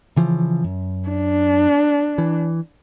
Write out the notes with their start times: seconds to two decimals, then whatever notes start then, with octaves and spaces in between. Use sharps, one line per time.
0.16 C#3 E3 F3
0.64 F#2
1.09 D4
2.18 E3